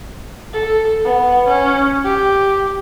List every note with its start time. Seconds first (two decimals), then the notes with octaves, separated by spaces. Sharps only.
0.54 A4
1.05 B3
1.48 C#4
2.04 G4